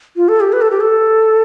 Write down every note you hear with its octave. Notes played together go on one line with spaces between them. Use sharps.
F4
A4
G4
B4
A4
G4
A4